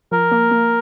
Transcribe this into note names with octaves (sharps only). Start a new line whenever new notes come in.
F3 A#4
A#3
A#3